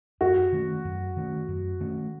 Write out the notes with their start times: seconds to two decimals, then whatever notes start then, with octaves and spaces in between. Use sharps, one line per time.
0.21 F#2 F#4
0.52 D#3 A3 C#4
0.85 F#2
1.17 D#3 A3 C#4
1.48 F#2
1.80 D#3 A3 C#4